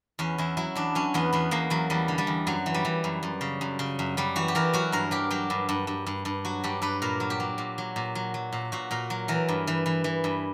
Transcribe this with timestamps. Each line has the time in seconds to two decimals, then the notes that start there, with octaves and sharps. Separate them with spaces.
0.19 E2 C#4
0.38 E2 E4
0.57 F#3 E4
0.75 E2 D4
0.95 F#3 C#4
1.14 E2 B3
1.33 E2 B3
1.51 E2 A#3
1.70 E2 F#3
1.90 E2 G3
2.08 D3
2.18 G3
2.27 E2
2.47 F#2 F#3
2.66 E3
2.74 G3
2.85 E3
3.04 F#2
3.23 F#2
3.41 C#3
3.61 F#2
3.79 C#3
3.99 F#2
4.17 F#2 G3
4.36 E3 F#4
4.48 G4
4.55 E3 A#4
4.73 F#3 F#4
4.92 G2 A#4
5.11 F#3 G4
5.31 F#3 G4
5.50 G2
5.69 G2
5.87 G2
6.06 G2
6.25 G2
6.45 F#3 F#4
6.64 G2 G4
6.82 G2 B4
7.02 A#2 A#4
7.20 F#3
7.30 G4
7.40 F#3
7.58 A#2
7.78 F#3
7.96 A#2
8.15 F#3
8.34 F#3
8.53 A#2
8.72 A#2 F#4
8.91 A#2 A#4
9.10 F#3
9.28 E3 A#4
9.48 G2
9.67 E3
9.86 E3
10.04 E3
10.24 G2